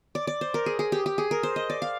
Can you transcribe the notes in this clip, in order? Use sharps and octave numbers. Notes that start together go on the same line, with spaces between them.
D5
D5
C5
A#4
G#4
G#4
G4
G4
G#4
A#4
C5
D#5
D5
F5